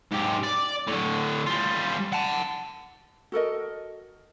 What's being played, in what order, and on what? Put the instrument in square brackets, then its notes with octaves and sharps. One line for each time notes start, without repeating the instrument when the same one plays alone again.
[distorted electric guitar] G#2 G4
D5
A2 D3
G3 F4
F#5 A5
[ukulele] F#4 A4 A#4 D#5